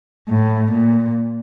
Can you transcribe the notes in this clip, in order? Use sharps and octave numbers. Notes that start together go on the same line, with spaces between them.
A2
A#2